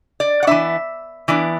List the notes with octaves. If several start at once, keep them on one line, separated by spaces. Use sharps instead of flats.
D5
F#5
E3 B3 D4 E5
E3 B3 D4